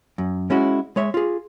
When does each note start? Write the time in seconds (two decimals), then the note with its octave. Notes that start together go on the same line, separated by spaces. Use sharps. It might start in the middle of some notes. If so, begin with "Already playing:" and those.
0.18 F#2
0.50 G#3 C#4 E4 F#4
0.96 G#3 C#5 E5
1.14 F4 G#4